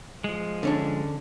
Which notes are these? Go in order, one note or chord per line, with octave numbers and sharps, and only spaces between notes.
F3 G#3
D3 C#4 D4